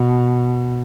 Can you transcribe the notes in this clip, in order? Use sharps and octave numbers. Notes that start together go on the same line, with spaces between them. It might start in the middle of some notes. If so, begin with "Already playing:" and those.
Already playing: B2